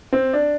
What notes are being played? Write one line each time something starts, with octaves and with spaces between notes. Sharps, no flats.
C4
D4